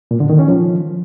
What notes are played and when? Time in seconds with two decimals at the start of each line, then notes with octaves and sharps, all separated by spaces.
0.11 A#2
0.20 D3
0.30 D#3
0.39 C#4
0.48 F3